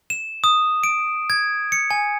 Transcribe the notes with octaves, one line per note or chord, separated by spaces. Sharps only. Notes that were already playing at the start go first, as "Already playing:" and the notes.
E7
D#6
D7
G#6
C#7
G#5